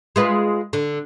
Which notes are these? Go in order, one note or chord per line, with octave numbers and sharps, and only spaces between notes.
G#3 F4 B4
D3